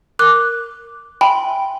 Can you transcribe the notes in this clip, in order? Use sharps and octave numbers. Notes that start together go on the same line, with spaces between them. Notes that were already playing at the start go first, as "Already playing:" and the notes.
A#4 D6 F#6
E5 G5 G#5 B5 C6